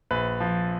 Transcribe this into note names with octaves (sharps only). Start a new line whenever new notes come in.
A#1 B4
F3